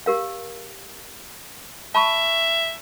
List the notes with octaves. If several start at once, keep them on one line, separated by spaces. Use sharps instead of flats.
G4 A#4 F5
E5 A5 B5 C#6